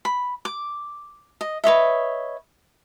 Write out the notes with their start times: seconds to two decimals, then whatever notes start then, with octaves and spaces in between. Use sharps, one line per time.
0.05 B5
0.45 D6
1.41 D#5
1.64 B4 C#5 D#5 E5